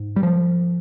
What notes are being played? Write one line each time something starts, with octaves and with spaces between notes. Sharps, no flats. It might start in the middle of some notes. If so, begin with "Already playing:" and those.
Already playing: G#2
G3
F3